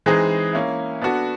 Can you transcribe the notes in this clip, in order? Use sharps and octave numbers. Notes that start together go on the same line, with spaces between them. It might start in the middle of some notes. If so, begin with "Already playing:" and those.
E3 G#3 C4 D#4 G#4
A#3 C#4 E4
B3 D4 F#4 A4